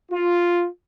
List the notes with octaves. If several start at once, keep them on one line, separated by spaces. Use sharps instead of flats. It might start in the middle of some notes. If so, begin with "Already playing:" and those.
F4